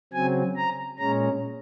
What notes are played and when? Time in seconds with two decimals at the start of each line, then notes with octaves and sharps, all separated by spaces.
0.13 C#3 F#3 C4 G#5
0.57 A#5
0.99 A#2 G#3 C#4 A#5